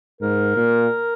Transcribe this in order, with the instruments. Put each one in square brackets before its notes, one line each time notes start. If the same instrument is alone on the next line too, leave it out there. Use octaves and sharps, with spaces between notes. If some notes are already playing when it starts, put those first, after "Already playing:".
[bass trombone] G#2 [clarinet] A#4
[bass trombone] A#2